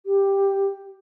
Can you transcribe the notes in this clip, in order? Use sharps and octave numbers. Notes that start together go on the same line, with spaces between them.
G4